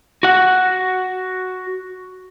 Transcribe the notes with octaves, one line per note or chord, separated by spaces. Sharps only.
F#4 F#5